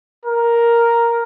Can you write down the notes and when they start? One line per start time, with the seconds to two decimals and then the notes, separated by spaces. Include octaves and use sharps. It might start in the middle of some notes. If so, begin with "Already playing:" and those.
0.24 A#4